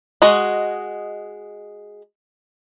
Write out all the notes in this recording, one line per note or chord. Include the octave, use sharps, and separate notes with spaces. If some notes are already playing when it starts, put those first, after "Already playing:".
G#3 F#4 D#5